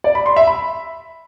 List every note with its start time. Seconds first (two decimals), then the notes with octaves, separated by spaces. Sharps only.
0.04 D5
0.15 B5
0.26 C6
0.36 E5
0.47 B5